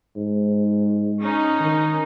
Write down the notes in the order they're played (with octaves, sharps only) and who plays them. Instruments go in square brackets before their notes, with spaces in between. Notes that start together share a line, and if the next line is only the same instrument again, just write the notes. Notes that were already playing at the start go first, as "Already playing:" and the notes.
[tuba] G#2
[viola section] C#4 D#4
[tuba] D#3